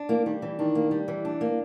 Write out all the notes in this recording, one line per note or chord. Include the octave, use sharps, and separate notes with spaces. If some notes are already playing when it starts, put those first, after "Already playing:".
Already playing: D4
E3 A#3
D#3 G3
E3
D#3 D4
A#3
G3
E3
D4
A#3